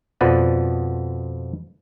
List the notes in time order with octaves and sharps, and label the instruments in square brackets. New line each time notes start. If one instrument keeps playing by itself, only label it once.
[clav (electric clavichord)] F2 B2 F3 B3 B4 D5